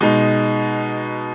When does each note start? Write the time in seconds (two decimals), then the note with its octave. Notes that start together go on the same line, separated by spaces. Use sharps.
0.01 B2 G#3 D#4